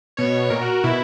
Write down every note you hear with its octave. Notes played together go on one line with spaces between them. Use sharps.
B2 C#5
A#2 A#4
F#4
F#4
B2 E4